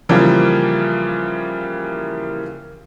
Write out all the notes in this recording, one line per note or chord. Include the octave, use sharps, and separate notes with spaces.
C#3 E3 F3 G3 A#3